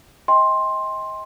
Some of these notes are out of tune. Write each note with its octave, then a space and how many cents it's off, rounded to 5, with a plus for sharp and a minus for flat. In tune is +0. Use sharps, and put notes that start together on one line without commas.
D#5 +30 G5 +30 C6 +10